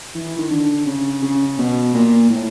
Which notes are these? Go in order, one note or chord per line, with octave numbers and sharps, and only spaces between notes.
E3
D#3
D3
C#3
C#3
B2
A#2
A2